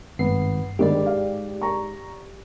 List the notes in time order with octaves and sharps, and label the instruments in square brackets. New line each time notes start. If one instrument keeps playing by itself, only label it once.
[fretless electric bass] G#1 [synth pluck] G2 C7 [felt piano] B3
[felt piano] D2 D#3 G3 [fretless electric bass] G#2 [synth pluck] G4 D5
[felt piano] F5
A#5 C#6